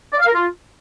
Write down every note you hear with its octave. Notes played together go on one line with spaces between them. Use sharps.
D5
F5
A#4
F4